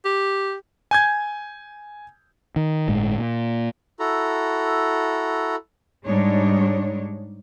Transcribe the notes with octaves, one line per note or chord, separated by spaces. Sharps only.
G4
G#5 G6 G#6
D#3
G1 A2 G#3
A#2
E4 F#4 A4 A#5
G#2 G3 G#3 D4 D#4 C#5